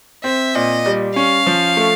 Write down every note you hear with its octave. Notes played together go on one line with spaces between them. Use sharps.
C4 E5
A#2 D#5
G3
C#4 F5
F3
A3